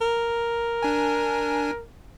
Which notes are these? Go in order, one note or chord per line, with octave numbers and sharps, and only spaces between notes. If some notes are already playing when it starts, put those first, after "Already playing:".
A#4
D4 G#5